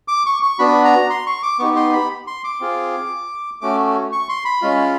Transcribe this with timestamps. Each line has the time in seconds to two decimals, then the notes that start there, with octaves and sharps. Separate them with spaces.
0.08 D6
0.26 C#6
0.43 C#6
0.59 B3 D4 F#4 B5
0.85 A#5
1.10 C6
1.27 C#6
1.43 D6
1.59 B3 D#4 G4 C#6
1.76 C6
1.93 B5
2.27 C6
2.44 D6
2.60 C4 F4 G#4
3.61 A3 C#4 F#4 D6
4.12 C#6
4.29 C6
4.45 B5
4.62 G#3 C#4 F4